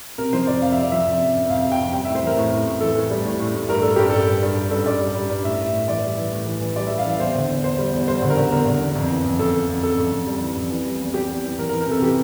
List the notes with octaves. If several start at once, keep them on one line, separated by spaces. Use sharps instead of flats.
C3 A#4
F3 C5
F2 D5
F2 F5
C3 E5
D5
F3 E5
F2
C3
F2
F2 F5
C3
G5
F2
G3 G5
A2 E5
C5
E3 A#4
A2
A2
A2
E3 A4
A2
G3
A2
A2
A2
G2 A#4
G3 A4
G2 G4
G2 A4
G2
G2
G3
G2 A4
G2 D5
G3
G3
G2
A2 E5
A2
A2
E3 D5
G3
E3
A2
E3
E3
G3 D5
G3 E5
F5
E3 E5
E2 C5
D3
E2
E2 C5
G3
E2
G3 C5
D3
A#4
D3
E2 A#4
D3
E2
F2
E3
F2
F2 A4
F2
F2
F2 A4
F2
F2
G3
E3
F2
E3
G3
E2
E2 G4
E2
E3
E3 A#4
A#4
E3
A#4
C3 A4
E3 G4